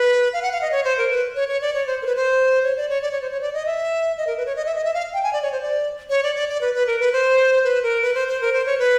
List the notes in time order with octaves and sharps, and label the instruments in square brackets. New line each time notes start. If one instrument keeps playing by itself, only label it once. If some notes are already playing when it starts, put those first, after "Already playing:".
Already playing: [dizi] B4
F5
F#5
F5
D#5
C#5
C5
A#4
B4
C#5
C#5
D5
C#5
C5
A#4
B4
C5
C#5
D5
C#5
D5
C#5
C5
C#5
D5
D#5
E5
D#5
A#4
B4
C#5
D#5
E5
D#5
E5
F5
G5
G#5
D5
C#5
C5
D5
C#5
D5
D5
D5
B4
B4
A#4
B4
C5
B4
A#4
B4
C5
C5
A#4
C5
C#5
B4